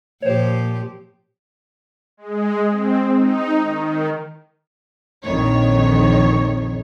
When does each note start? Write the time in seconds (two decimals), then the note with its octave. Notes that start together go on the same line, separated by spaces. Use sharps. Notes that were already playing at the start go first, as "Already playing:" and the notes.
0.22 A#2 F3 G4 C5 C#5
2.17 G#3
2.70 C4
3.16 D#4
3.63 D#3
5.23 A#1 F2 D#3 C#5